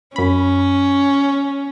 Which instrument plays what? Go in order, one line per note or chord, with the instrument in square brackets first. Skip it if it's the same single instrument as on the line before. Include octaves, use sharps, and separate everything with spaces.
[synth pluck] F#2 B5 [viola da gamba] C#4